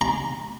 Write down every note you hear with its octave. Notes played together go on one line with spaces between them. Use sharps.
A#5